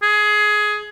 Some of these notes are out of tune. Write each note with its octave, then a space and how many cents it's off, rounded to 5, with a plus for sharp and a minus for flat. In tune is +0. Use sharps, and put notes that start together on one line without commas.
G#4 +15